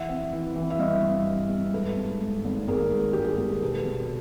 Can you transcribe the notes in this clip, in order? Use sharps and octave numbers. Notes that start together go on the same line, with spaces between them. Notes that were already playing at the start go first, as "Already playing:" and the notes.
Already playing: E3 E5 F#5
C4
E3
E3
E5
G2 D#5 F5
G2
C4
G2
G#2 A4 B4
G#2
G#2
G#1
G#1 G#4 A#4
G#2
G#1 G4
G#4
G#1 A4
A#4
B2 A4 B4
B2